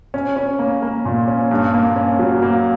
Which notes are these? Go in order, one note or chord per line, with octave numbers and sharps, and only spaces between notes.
C#4
C#4
A#3
A#3
A#2
C#4
G2
A#3
C#4
F#3
A#3